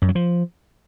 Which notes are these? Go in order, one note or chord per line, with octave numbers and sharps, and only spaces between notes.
F#2
F#3
F3